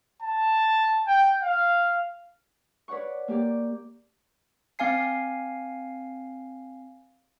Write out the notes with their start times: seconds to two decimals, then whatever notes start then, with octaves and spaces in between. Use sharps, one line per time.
0.22 A5
1.07 G5
1.43 F5
2.88 B4 C#5 D5 F#5 C#6
3.28 A#3 G4 D5
4.79 C4 F5 G#5 C7